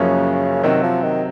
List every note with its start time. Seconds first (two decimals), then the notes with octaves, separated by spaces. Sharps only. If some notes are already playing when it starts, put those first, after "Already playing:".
Already playing: F#1 F#2 C#3 F3 A#3 C#4
0.63 C3 D#3 F#3 C4 F#4
0.83 F3
1.03 D#3